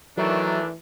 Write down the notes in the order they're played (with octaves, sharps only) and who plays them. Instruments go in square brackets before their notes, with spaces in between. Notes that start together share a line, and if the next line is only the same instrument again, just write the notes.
[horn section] D#3 A3 D4 [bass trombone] E3 [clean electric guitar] F#3